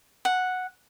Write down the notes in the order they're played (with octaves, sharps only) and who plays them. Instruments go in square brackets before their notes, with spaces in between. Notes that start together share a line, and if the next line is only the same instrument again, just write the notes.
[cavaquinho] F#5